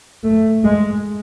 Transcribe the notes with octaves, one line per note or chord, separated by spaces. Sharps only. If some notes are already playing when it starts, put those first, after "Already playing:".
A3
G#3